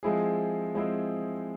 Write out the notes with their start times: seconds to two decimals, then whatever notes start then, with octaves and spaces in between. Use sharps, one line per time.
0.03 F3 G#3 C4 E4 G#4
0.74 F3 G#3 C4 E4 G#4